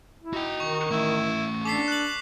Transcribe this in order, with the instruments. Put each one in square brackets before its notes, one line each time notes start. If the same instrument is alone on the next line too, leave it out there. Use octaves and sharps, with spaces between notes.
[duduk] E4
[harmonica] D#4 [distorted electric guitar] F#4 G5
[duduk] D#3 [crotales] C#6
[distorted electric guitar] A3 C#4 [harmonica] E4
[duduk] D4 [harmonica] A4 [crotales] D6 B6 C7
[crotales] F#6 F#7